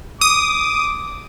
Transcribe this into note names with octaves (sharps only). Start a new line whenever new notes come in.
D6 D#6